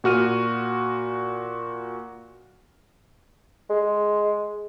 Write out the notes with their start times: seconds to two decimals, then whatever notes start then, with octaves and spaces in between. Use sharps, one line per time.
0.04 A#2 F#4 F6 D#7
3.70 G#3